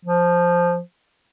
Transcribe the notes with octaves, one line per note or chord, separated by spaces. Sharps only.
F3